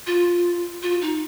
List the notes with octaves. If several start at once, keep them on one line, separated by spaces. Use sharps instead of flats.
F4
F4
D#4